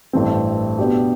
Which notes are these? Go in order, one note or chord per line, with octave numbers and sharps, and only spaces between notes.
A1 G2 E3 A3 C4
B2 B3 D4 G4